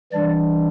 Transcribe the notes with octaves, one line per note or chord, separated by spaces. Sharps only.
E3 G3 D4 D5